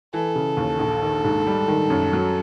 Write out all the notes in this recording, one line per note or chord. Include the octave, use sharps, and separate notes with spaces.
E3 A4
C#3
D#2
A#1
D#3
G#2
G3
D#3
F#2
F#3